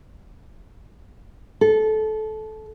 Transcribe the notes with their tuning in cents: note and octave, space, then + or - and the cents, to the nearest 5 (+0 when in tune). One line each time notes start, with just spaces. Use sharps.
A4 -20